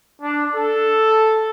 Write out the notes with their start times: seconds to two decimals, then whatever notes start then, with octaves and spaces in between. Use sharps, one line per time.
0.21 D4
0.55 A4